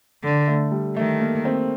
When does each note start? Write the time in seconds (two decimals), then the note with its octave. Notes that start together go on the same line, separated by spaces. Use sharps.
0.23 D3
0.47 A3
0.71 G3
0.97 D#3 A3
1.20 A#3
1.45 C4